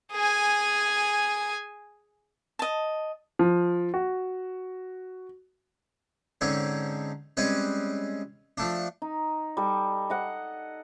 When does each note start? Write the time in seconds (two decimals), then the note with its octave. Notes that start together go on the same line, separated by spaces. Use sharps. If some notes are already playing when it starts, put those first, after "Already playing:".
0.12 G#4 G#5
2.59 D#5 A5
3.39 F3
3.94 F#4
6.41 G#2 D3 C4 C#4
7.37 G3 G#3 C4 C#4 B4
8.58 F3 A3 D4
9.02 D#4
9.57 G3 A4
10.10 D#5 F#5